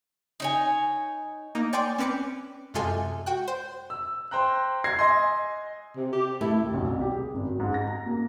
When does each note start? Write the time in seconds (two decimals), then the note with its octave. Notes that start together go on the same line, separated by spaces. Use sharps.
0.40 D#4 C#5 G#5
1.55 A#3 D#4
1.73 C#5 D5 G5 G#5 C6 D6
1.98 C4 C#4 B4 D6 C#7
2.74 F#2 C3 G#3 F4 A4 G#5
3.26 F#4 G5 F#6
3.48 C5
3.90 E6
4.31 C5 G5 A#5 F#6
4.84 G#6 A#6 C7
4.99 D#5 G#5 C6
5.96 C3
6.13 G4
6.41 A3 E4
6.60 D#2
6.74 B1
6.87 C2
7.01 G4
7.16 G#4
7.34 G#1
7.46 F#3
7.60 G#2
7.74 A#6
7.87 A#5
8.06 A#3